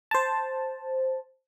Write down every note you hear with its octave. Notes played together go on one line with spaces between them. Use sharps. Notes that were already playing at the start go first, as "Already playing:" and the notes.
C5 A5